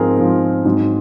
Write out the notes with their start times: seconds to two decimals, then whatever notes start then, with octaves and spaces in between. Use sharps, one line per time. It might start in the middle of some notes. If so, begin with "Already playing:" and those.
Already playing: G#2 F3 C4 G#4 A#4
0.17 G#2 F3 C4
0.65 G#2 F#3 C4